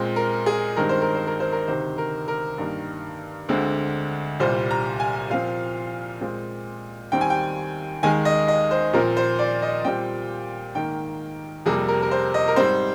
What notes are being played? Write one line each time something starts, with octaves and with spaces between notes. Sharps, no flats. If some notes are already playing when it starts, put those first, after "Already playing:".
Already playing: A#2 G#3 C4
A#4
G#4
G2 D#3 G#3 C4 A#4
C5
A#4
C5
A#4
C5
A#4
D2 C3 D#3 C5
A#4
A#4
G2 D#3 A#3
D2 D3 G#3 C4
C2 A#2 G3 C5
A#5
G#5
A#2 F3 C4 F5
A#2 G#3 C4
D#2 D#3 G3 C4 G5
G#5
G5
D#2 D#3 G#3 G#5
D#5
D#5
C5
A#2 F3 C4 A#4
C5
D5
D#5
A#2 G3 C4 G5
G#2 D#3 A#3 G5
F2 C3 G3 A#3 G#4
A#4
A#4
C5
D#5
A#4
G#2 G3 C4 C5